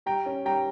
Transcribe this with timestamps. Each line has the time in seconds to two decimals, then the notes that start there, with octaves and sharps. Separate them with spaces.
0.06 G3 G5 A#5
0.26 C#4
0.45 G3 G5 A#5